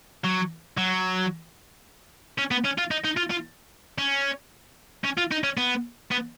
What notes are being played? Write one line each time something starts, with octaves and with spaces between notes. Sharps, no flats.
F#3
F#3
C#4
B3
C#4
F4
D#4
D#4
F4
F4
C#4
C#4
F4
D#4
C#4
B3
B3